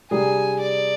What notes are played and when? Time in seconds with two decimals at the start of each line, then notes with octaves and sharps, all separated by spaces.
0.11 C3 G3 D4 G#4 G#5
0.60 D5